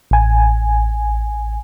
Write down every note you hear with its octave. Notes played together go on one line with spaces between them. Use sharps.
A1 G#5